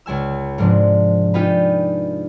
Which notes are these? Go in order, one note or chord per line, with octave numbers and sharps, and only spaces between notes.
C#2 G#3 G#5 E6
G#2 C3 F3 G#3 D4
D4 D#4 F4 G4 G#4 B4